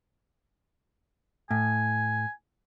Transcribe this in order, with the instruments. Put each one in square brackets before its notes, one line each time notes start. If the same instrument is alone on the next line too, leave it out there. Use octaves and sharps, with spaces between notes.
[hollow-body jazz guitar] A2 [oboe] G#5